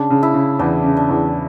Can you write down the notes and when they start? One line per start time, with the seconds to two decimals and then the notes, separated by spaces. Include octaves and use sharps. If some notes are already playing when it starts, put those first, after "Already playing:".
Already playing: C#3 D4
0.10 C#3
0.23 E4
0.34 C#3
0.59 E2 D4
0.84 C#3
0.97 D4
1.10 E2